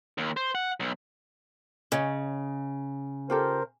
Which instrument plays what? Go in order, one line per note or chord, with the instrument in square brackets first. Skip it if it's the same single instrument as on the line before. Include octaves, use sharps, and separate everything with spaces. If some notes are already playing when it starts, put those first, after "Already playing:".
[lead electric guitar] D#2
C5
F#5
B1
[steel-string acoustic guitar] C#3 [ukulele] C#5 D#5
[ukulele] F4 G4 A4 [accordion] A#4 C5